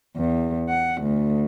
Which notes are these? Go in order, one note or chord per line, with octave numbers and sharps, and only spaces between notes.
E2
F#5
D2